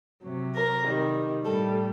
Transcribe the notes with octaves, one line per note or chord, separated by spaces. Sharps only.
C3 F#3
A#4
C3 D#3 G3
A2 G3 A4